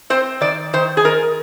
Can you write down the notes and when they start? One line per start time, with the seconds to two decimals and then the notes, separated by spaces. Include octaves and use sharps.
0.10 C4 C5
0.41 D#3 D5
0.73 D#3 C5
0.97 G#4
1.04 D#3 A#4